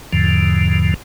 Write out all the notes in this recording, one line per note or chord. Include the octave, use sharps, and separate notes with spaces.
E2 G#2 D3 F3